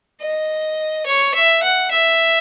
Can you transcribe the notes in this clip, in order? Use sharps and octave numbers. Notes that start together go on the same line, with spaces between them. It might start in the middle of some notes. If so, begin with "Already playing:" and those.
D#5
C#5
E5
F#5
E5